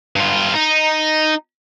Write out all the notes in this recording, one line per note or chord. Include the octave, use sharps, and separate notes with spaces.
G2 F4
D#4